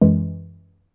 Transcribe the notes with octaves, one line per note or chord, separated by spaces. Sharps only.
F#2 E3 G#3